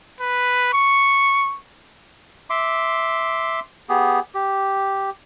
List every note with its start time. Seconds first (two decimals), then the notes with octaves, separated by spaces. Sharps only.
0.20 B4
0.73 C#6
2.50 E5 C6 D6
3.89 B3 G4 G#4
4.34 G4